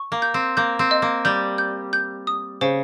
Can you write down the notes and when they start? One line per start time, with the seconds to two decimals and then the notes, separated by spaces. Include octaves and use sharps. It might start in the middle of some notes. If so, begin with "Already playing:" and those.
Already playing: C#6
0.12 A#3
0.22 G6
0.34 C4
0.57 A#3 G6
0.79 C4
0.91 D#5
1.02 A#3
1.25 G3 G6
1.58 G6
1.93 G6
2.27 D#6
2.61 C#3 C5